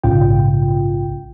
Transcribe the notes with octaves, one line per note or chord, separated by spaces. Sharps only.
A#1 G#2 C#3 F4 G5